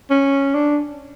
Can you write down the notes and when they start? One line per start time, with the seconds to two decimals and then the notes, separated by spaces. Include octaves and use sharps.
0.10 C#4
0.55 D4